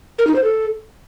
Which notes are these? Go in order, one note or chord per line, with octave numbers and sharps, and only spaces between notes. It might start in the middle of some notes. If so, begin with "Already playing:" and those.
A#4
D#4
C5
A4